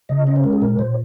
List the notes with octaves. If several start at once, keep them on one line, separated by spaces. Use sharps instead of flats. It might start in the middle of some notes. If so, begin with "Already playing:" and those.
C#3 D#5
C#4 D#5
C5
G#3 A#4
G#4
A#2 A#4
A#2 C5